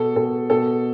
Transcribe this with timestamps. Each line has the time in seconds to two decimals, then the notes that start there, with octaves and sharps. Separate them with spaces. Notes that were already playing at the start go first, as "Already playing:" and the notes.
Already playing: B2 A4
0.16 B2 A4
0.50 B2 A4